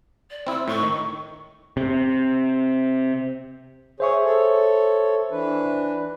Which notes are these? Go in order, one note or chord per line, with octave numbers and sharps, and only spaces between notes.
D5
C4 E4 E6
A2 C#6
D#3
C3
G#4 C5 C#5 E5 C#6
A4 C#5
E3 D4 B4